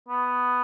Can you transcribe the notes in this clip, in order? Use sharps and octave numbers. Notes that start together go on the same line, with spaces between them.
B3